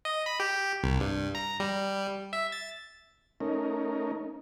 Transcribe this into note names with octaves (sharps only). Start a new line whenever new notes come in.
D#5
B5
G4
C2
G2
A#5
G3
E5
A6
A3 C#4 D#4 A#4